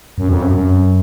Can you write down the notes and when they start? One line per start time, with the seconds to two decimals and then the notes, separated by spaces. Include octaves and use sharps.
0.18 F#2
0.29 F2
0.42 F#2
0.54 F#2